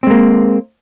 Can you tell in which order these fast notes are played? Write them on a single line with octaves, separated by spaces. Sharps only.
C4 G#3 A#3